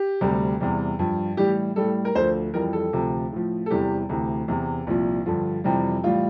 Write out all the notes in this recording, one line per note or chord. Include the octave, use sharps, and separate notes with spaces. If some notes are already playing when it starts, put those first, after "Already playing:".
Already playing: G4
D2 C3 G3
E2 C3 G3
G2 F3
A2 E3 G3 G4
A2 G3 A4
A#4
D2 D3 F3 C5
F2 E3 G3 A#4
A4
D2 C3 F3
A2 F3
A4
E2 C3 E3 G3 G4
D2 C3 E3
E2 C3 E3
C2 A#2 F3
G2 D3 F3
F2 C3 E3 G3
A2 E3 G3 F4